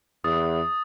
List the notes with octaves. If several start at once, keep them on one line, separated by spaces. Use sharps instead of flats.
E2 D#6 A6